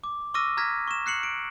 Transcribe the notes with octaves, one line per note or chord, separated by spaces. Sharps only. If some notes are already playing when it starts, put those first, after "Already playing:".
D6
C#6 D6 E6 F6 A#6 D#7
A#5 F6 G#6 A#6 B6
C#6 E7
F#6 C7 C#7 F#7
D7